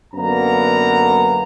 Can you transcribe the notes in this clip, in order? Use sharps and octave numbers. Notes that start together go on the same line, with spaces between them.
F#2 D3 A#3 B3 A#5